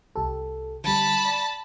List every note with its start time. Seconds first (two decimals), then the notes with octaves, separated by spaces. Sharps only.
0.16 C2 G4 A4
0.84 D3 G3 A5 B5
1.25 D5